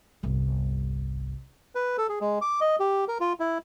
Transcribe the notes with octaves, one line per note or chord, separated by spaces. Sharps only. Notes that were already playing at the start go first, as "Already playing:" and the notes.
G1 C2
B4
A4
G#4
G#3
D6
D#5
G4
A#4
F4
E4